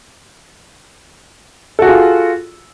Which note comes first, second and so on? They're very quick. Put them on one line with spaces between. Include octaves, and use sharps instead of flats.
A4 F#4 G#4 F4